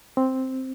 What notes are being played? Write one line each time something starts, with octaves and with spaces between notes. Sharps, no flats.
C4